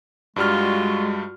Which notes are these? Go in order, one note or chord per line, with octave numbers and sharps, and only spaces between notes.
G2 G3 G#3 F4 F#4 F6